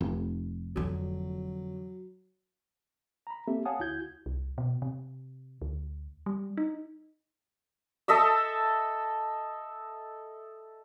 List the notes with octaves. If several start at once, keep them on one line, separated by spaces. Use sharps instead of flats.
F1
F2 D3 F#3
A#5 B5
A#3 C4 G4 A4 E5
C#5 F5 F#5 G#5 A5 D#6
D2 E4 F#4 G6 G#6
C2
B2
C3
D2
G3
D#4
A4 D#5 E5 E6